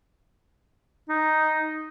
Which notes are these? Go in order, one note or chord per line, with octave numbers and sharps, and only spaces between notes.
D#4